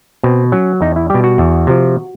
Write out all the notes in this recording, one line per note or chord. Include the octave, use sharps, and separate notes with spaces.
B2 C4
F#3 C#4
E2 D#4
E4
B2 G3 G4
F#4
E2
C3 F3